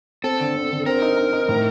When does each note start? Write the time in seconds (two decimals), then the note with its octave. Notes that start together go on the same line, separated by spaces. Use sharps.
0.24 C4 A4
0.40 D3
0.55 C4
0.71 D3
0.86 C4 A#4
1.02 D#4
1.17 D#4
1.33 D#4
1.48 A2